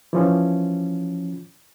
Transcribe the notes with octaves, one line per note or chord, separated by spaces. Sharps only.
E3 F3 C#4